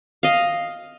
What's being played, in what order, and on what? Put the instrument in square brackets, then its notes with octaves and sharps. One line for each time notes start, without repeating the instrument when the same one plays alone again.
[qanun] D#5 F5